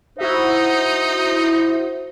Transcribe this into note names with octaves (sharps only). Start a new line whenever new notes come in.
D#4 E4 F#4 C5 E5